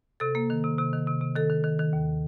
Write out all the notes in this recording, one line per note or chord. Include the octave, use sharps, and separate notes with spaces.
C3 A4
A#3
D#3
C3
C3
D#3
C3
C3
D#3 A4
D#3
D#3
D#3
D#2